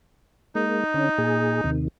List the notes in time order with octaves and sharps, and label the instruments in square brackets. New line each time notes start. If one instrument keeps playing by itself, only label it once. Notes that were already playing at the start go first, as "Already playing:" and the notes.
[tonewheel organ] G#3 A#3 [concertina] D#4
[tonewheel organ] D3 C#4
A#2 G#4
D#2 C3 D#3